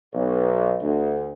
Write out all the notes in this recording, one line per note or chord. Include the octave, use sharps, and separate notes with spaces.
B1
D2